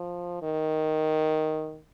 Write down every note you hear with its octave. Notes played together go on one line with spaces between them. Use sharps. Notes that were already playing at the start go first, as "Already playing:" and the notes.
Already playing: F3
D#3